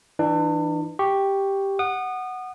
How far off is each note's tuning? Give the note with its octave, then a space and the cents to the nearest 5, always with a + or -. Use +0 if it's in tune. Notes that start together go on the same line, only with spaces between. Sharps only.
E3 +0 D4 +35
G4 +0 C#6 +0
F#5 +0 D#6 -30